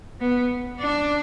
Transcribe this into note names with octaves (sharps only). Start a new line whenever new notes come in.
B3
D4